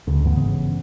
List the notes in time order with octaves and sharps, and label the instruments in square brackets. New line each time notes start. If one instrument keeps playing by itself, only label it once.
[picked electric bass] D2 [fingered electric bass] C#3
[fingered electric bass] G2 E3 B3
[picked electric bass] G#1 C#3